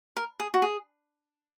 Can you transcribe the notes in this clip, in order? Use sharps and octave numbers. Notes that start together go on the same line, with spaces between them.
A#4
G#4
F#4
G#4